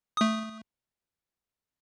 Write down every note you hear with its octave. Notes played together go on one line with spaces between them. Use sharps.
A3 D#6